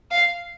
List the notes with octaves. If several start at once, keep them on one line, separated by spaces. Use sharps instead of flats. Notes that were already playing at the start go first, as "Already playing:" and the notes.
F5